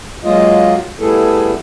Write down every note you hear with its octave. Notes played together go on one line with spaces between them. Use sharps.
F#3 G#3 A#3 F4 D#5
G3 A3 B3 E4 G#4 A4